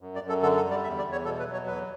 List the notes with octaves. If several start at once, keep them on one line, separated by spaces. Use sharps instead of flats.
F#2
D5
F#2
A4
D3 A4
A4
G3
D5
E2 E5
D5
E2
C#5
B2 A4
B4
F#3
C#5
E2 B4